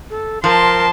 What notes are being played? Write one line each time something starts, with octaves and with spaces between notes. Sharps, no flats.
A4
F3 A#4 A5 C6